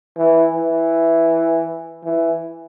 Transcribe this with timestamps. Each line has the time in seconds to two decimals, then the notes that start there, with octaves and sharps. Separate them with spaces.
0.17 E3
0.54 E3
2.04 E3